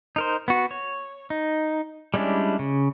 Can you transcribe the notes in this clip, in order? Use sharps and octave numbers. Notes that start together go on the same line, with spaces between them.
D#4 A#4 C5
B3 F#4
C#5
D#4
G3 G#3 C#4 D4 E4
C#3